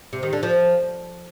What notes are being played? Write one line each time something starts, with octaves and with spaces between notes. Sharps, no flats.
C3
D#3
D3
F3